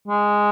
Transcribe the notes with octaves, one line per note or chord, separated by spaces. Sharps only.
G#3